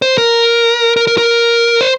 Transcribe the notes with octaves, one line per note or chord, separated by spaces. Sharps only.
C5
A#4
A#4
A#4
A#4
C5